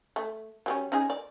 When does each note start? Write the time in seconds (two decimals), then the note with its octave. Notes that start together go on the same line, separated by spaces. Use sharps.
0.16 A3
0.66 F#3 G3 C#4
0.92 C#4 D#4 G#4
1.10 D5